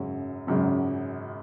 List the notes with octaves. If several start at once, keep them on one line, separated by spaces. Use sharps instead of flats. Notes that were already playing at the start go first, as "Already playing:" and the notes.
Already playing: G#1 F#2 C#3 F#3
G#1 F#2 C#3 F#3